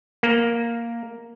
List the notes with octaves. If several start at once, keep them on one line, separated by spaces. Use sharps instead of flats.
A#3